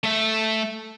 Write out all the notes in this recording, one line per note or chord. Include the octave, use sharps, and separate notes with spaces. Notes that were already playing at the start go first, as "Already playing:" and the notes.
A3 E5